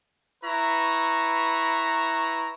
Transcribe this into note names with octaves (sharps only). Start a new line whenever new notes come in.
E4 B4 A#5 C#6